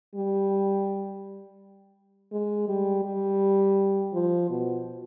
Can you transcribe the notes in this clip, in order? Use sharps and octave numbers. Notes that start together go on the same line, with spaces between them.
G3
G#3
G3
G3
F3
B2